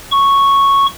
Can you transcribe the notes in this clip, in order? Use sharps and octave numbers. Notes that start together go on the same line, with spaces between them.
C#6